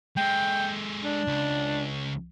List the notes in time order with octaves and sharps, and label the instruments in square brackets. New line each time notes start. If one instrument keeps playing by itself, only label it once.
[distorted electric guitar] G#3 A4 [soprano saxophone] G5
[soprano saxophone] D4
[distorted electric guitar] C#2